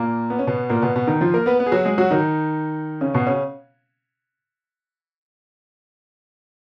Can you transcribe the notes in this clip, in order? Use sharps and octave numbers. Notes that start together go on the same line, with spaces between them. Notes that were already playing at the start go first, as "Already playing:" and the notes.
Already playing: A#2 A#3
B3
C#4
B2 B3
A#2 A#3
B2 B3
B2 B3
D#3 D#4
F3 F4
A#3 A#4
B3 B4
B3 B4
G#4
F#3 F#4
G#3 G#4
F#3 F#4
D#3 D#4
C#3 C#4
B2 B3
C#3 C#4